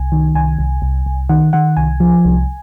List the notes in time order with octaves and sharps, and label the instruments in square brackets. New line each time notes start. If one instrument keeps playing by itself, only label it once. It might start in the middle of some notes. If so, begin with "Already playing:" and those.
Already playing: [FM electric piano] C2 G#5
D#3
C2 G#5
C2
C2
C2
D#3 F#5
D#3 F#5
C2 G#5
F3
C2